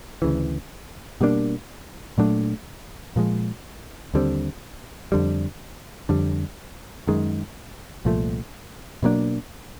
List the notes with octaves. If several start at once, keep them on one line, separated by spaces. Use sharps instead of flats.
D2 C#3 E3
B2 G3 A#3 D4
A#2 F#3 A3 D4
A#2 F3 G#3
D#2 D3 G3 C4
F2 D3 G3
F2 D3 G3
F#2 D#3 G#3
C2 A#2 F3 A3
B2 F#3 A#3 D4